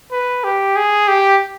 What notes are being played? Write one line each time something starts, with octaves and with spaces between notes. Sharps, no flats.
B4
G4
G#4
G4